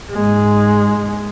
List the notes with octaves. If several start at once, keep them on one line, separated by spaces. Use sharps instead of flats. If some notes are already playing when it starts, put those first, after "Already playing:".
G#2 G#3